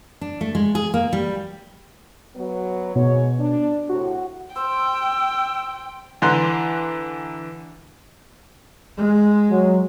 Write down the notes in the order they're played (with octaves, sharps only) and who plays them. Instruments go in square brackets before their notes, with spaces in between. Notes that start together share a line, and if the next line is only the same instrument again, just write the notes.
[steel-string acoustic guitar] D4
A3
G#3
G#4
A#3
G3
[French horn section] F#3 B3
[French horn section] G#2 C#5 [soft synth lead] B2
[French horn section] D4
[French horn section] A2 C3 [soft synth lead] F#4
[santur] C5 [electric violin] G5 [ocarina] E6
[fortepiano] D3 E3 A#5 C6 F#6
[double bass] G#3
[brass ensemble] F#3